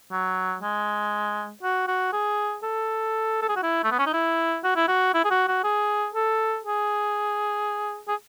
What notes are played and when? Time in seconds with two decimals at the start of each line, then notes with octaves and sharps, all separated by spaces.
0.12 F#3
0.62 G#3
1.63 F#4
1.88 F#4
2.13 G#4
2.63 A4
3.42 A4
3.49 G#4
3.56 F#4
3.63 E4
3.84 A3
3.91 B3
3.99 C#4
4.06 D#4
4.14 E4
4.64 F#4
4.76 E4
4.88 F#4
5.14 E4
5.25 G#4
5.31 F#4
5.48 F#4
5.64 G#4
6.14 A4
6.65 G#4
8.08 G#4